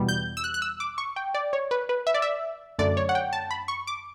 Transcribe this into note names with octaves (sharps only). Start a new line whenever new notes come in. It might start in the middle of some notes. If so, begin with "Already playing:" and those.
Already playing: E2 B2 G3 B3
G6
E6
F#6
F#6
E6
D6
C#6
G5
D5
C#5
B4
B4
E5
D5
E5
F#2 D3 A3 D5
C#5
F#5
G5
A5
B5
C#6
D6